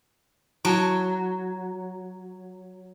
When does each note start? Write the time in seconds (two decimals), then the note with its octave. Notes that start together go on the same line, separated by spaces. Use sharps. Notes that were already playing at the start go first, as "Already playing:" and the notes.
0.65 F#3 E4 F#4 A5